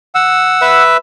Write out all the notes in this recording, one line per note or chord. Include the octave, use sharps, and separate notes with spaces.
F#5 E6
B4 E5